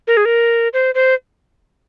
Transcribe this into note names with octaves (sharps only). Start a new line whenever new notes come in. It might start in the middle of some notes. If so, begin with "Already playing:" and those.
A#4
G#4
A#4
C5
C5